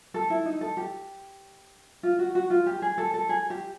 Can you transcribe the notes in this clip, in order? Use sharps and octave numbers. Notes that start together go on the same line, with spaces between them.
A4
E4
D#4
A4
G4
F4
F#4
F#4
F4
G4
G#4
A4
A4
G#4
G4